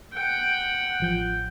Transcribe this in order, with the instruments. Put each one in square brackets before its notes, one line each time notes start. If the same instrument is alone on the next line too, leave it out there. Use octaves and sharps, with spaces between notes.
[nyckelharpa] F#5 G5
[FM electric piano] A1 F3 G6